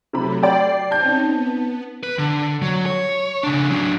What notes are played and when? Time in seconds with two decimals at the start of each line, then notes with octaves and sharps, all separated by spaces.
0.13 C3 F#3 A3 B5
0.43 D5 G5 C7
0.91 C4 C#4 D#4 A5 G6
1.27 B3
2.03 B4
2.19 D3
2.62 F#3
2.86 C#5
3.43 C#3 D4
3.70 F#3 D4